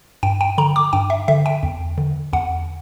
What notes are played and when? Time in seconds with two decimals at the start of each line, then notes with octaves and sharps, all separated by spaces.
0.23 G2 G5
0.41 G5
0.58 D3 A#5
0.76 D6
0.93 G2 G5
1.10 E5
1.28 D3 E5
1.46 G5
1.63 E2
1.98 D3
2.33 E2 F#5